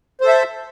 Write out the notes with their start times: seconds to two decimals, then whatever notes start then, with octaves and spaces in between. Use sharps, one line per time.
0.21 C5
0.24 A4
0.28 E5